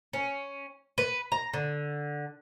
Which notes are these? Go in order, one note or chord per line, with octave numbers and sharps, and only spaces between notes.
C#4
B4
A#5
D3